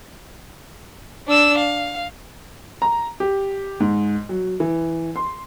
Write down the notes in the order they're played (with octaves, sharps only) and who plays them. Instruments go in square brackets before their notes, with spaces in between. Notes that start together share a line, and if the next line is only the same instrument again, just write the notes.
[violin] D4 E6
F5
[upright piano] A#5
G4
G#2
F#3
E3
C6